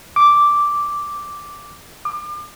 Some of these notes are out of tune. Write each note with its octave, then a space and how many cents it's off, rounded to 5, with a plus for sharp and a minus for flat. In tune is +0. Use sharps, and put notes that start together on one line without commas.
D6 -5
D6 +35